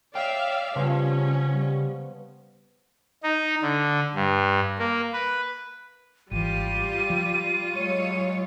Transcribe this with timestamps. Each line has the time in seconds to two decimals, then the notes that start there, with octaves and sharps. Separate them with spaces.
0.15 C#5 D5 E5 F5 G5
0.76 C#3 F3 G3 B3 C#4 C6
1.52 G3
3.23 D#4
3.62 D3
4.15 G2
4.78 A#3
5.13 B4
6.31 G#1 E3 G3 F4 G4 D#7
7.10 F3
7.75 F#3 G#3 C#5